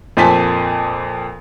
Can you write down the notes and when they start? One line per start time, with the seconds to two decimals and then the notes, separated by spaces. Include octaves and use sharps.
0.17 F2 A#2 C5 G#5 A5 B6